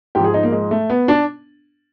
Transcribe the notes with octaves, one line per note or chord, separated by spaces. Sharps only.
G#2 F3 G4
G#4
D#4
A#3
G#3
A3
B3
D4